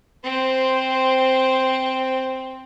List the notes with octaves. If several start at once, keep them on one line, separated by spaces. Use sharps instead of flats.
C4 C5